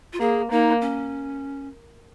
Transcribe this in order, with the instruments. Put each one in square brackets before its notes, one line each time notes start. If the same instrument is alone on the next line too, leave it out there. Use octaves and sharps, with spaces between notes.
[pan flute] F4
[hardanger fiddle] A#3 [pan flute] G#4
[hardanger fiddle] A#3 [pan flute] D#4
[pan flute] C#4